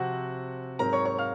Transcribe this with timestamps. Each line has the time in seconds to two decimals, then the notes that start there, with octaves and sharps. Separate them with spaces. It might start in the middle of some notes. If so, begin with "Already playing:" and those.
Already playing: C3 F3 C4 F#4 F#5
0.79 G#2 F#3 C4 A#4 A#5
0.93 C#5 C#6
1.05 C#5 C#6
1.18 F5 F6